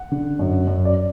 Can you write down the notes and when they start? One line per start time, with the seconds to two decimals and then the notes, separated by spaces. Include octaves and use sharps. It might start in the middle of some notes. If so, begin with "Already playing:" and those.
Already playing: F#5
0.12 D3
0.39 F#2
0.67 F#2
0.85 D5